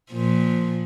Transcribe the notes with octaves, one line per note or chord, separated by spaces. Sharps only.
A#2 F3